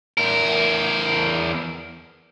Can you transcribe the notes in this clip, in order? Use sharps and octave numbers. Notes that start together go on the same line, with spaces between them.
E2 A#4